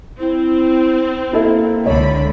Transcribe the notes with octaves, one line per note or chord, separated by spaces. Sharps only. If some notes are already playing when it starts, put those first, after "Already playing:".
C4 E4
A#3 E4 A4 E5
C#2 D3 C#5 B5